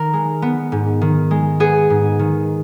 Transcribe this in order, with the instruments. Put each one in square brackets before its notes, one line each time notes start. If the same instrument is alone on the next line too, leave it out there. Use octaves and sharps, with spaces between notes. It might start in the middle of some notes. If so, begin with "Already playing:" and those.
Already playing: [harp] D#3 A#4
G#3
B3
G#2
D#3
G#3
B3 G#4
G#2
D#3